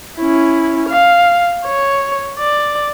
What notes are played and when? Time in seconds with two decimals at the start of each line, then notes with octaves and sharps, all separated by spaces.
0.18 C#4 E4
0.89 F5
1.65 C#5
2.39 D5